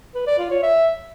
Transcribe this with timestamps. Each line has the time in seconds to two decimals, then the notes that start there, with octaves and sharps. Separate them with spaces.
0.15 B4
0.27 D5
0.39 F4
0.51 C#5
0.63 E5